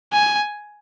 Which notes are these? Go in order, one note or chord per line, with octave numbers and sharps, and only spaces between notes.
G#5